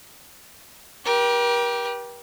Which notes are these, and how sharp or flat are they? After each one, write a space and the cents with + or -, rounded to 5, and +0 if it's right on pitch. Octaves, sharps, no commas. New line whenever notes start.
G4 -5 A#4 +40